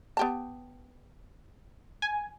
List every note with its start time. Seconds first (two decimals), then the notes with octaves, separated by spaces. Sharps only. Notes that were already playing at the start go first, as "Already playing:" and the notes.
0.17 B3 G4 A5
2.02 G#5